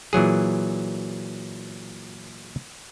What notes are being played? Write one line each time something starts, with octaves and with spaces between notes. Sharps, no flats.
A#2 E3 F#3 G#4